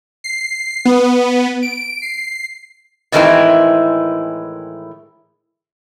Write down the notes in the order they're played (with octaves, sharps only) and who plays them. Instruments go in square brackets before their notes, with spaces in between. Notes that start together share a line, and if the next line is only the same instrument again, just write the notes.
[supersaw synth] C7
B3
D7
C7
[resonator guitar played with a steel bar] A2 D#3 E3 G#3 C4 E4